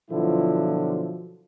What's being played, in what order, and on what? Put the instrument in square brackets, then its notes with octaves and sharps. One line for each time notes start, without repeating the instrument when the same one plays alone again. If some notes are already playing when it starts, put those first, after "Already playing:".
[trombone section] B2 D3 F3 F#3 E4 F4